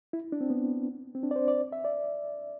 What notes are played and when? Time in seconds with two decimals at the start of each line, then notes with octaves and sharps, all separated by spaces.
0.13 E4
0.32 D4
0.41 C4
0.50 B3
1.15 C4
1.23 D4
1.31 D5
1.36 C5
1.48 D5
1.72 E5
1.85 D5